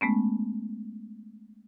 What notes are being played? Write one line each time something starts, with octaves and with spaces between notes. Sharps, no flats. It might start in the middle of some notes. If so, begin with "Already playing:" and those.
G#3 A3 B3 C#4